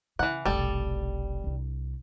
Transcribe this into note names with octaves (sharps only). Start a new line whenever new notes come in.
C#3 E3 F#5
F1 B1 G3 A4
C2 D4